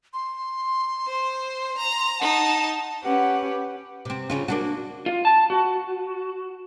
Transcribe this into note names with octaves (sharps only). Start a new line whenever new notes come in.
C6
C5
A#5
D#4 F#5 A5
C#4 G4 B4 F#5
C3 C4
C#3 C#4 F4
A#3 D4 F#4
F4
A5
F#4